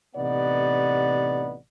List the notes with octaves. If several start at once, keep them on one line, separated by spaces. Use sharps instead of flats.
A1 C3 B3 D#4 D5 F#5